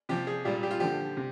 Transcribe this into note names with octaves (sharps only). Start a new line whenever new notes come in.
C3 F3 G4
G#4
A#2 G3 G4
G4
F4
D3 F3 G4
C3